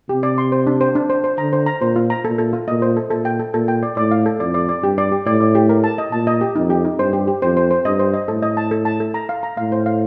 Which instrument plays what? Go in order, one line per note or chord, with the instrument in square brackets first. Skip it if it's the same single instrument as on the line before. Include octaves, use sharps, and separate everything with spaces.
[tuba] C3 [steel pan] G4
[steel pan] D5
C6
C5
D4
C5
D4
C5
C5
[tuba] D3 [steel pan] A#5
[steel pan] C5
A#5
[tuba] A#2 [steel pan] C5
[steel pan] F4
A#5
[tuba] A#2 [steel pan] A4
[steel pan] A4
F4
[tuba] A#2 [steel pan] D#5
[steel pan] C5
A4
[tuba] A#2 [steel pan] A4
[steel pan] G5
A4
[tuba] A#2 [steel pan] A4
[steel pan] G5
D5
[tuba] A2 [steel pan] D5
[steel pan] F5
A4
[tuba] F2 [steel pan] D5
[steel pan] D5
D5
[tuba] G2 [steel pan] G4
[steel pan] D5
G4
[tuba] A2 [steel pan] D5
[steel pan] D5
G4
A#4
A5
D#5
[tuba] A#2 [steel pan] A5
[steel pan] D#5
G4
[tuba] F2 [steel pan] D#4
[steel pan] G4
D#4
[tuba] G2 [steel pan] C5
[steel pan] G4
G4
[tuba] F2 [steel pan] C5
[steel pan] C5
C5
[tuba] G2 [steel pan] D#5
[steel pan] C5
D#5
[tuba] A2 [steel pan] A4
[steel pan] D#5
A5
A4
A5
A4
A#5
F5
A#5
[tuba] A2 [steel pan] F5
[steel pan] C5
F5